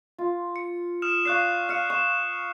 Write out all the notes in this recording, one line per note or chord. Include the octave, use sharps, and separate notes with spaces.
F4
C#7
D#6 F6 E7
D5 F5 C#6 F#6 C7
F5 F6 C#7
C#6 E7